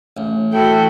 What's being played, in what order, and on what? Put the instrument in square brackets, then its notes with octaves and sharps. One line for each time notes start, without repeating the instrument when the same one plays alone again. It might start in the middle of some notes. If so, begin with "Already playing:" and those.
[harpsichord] A1
[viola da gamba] E3 E4 F#4 [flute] A4 [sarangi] G5